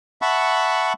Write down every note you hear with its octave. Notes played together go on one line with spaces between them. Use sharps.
E5 F#5 A5 B5 C#6